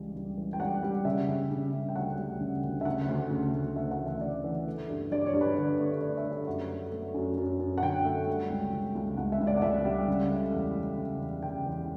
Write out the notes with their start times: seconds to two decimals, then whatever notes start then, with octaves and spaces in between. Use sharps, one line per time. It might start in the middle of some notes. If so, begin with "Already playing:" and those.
Already playing: C#2 C#3 E3 G3
0.16 G3
0.38 E3
0.53 G5
0.60 G3 F#5
0.83 G3
1.05 C#3 E5
1.28 C#3
1.51 C#3
1.73 G3
1.89 G5
1.95 D2 F#5
2.18 G3
2.41 C#3
2.64 D2
2.81 E5
2.85 C#3 F#5
3.08 D2
3.31 C#3
3.54 D2
3.76 D2 E5
3.91 F#5
3.99 E3
4.06 E5
4.21 D2 D5
4.44 E3
4.67 A3
4.89 G2
5.12 G2 D5
5.26 C#5
5.34 G2
5.41 B4
5.57 D3 D5
5.80 A3
6.01 D3 D5
6.17 E5
6.24 A3
6.31 E5
6.46 F#2 F#5
6.70 A3
6.92 A3
7.14 F#2
7.37 F#2
7.59 F#2
7.78 F#5
7.82 D3 G5
8.05 A3
8.27 G3
8.50 C#2
8.73 C#2
8.95 C#2
9.17 C#2 F#5
9.32 E5
9.40 C#2
9.47 D5
9.57 F#5
9.62 C#2 E5
9.85 G3
10.08 C#3
10.30 A3
10.53 E2 F#5
10.75 A3
10.98 C#3
11.21 E2
11.42 C#3 G5
11.66 E2